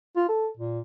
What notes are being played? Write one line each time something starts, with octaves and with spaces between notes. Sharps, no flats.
F4
A4
A#2